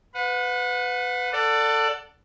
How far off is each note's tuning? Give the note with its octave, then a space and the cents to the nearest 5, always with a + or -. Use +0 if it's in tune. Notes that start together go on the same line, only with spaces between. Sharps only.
B4 +20 F#5 -35
A4 +20 D5 +0 F#5 +0